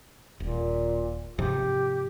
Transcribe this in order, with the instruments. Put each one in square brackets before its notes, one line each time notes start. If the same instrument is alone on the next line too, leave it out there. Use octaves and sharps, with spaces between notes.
[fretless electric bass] D#1 [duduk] A#2
[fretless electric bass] G#2 C3 F3 [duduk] G4